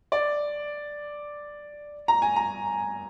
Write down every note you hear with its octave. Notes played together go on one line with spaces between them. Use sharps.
D5
A#5
G#5
A#5